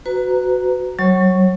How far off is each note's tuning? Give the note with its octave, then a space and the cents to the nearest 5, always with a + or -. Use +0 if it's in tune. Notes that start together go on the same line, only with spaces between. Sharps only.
F#4 +0 B4 +25 A#5 +0
F#3 +25 C#5 -30 C#6 +0